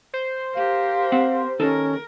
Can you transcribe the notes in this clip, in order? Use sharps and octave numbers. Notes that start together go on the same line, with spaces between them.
C5
G4 A#4 F5
C4 F#5
D#2 C#4 D#4 A4 A#4